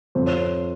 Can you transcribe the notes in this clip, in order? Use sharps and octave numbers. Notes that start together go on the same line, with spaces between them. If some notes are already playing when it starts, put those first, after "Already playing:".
F2 C5
C#5